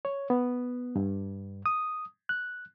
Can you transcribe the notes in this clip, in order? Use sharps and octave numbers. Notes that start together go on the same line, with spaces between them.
C#5
B3
G2
D#6
F#6